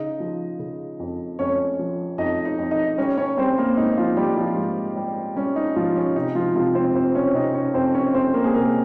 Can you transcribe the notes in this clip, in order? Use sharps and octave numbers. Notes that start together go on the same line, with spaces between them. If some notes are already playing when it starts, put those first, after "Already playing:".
Already playing: C#3 D#4 D#5
F3
C#3
F2
F2 C#4 C#5
F3
F2 D#4 D#5
D#4 D#5
F2
D#4 D#5
G3 C#4 C#5
C#4 C#5
G3 C4 C5
A#3 A#4
G#2 D#4
F3 F4
G3 G4
F3 F4
G#2
G3
G3 C#4
D#4
G#2 F3 F4
C#4
C3 D#4
F3 F4
C3 F3 F4
C4 C5
F2 C4 C5
C#4 C#5
C3 D#4 D#5
C#4 C#5
F2 C4 C5
C#4 C#5
F2 C4 C5
A#3 A#4
G#4
C3 A#3 A#4